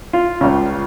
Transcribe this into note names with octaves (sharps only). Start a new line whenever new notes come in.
F4
C#2 C#3